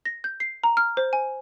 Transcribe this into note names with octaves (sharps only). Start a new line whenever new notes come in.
A#6
G6
C7
A#5
F6
C5
G#5